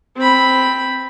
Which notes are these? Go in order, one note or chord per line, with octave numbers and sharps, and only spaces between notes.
C4 B5